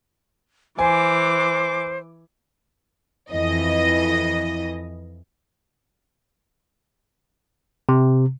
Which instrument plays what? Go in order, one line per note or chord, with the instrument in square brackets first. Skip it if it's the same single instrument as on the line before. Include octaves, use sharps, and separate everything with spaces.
[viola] E3 D6 [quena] C5 [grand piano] G#5
[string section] F2 E3 D#5
[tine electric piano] C3